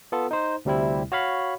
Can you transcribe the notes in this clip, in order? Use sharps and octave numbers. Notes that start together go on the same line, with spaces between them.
B3 F4 A4
D#4 C5
D2 C3 G3 C4 E4
F#4 C#5 F5 B5